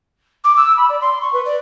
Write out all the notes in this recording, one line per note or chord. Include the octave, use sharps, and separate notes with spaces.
D6
E6
B5
D5
C6
C#6
B4
D5